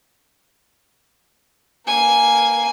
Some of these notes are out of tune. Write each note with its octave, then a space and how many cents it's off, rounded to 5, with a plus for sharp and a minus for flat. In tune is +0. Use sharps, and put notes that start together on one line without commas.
A#3 +0 G#5 +0